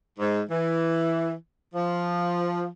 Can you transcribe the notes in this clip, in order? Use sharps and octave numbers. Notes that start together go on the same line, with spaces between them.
G#2
E3
F3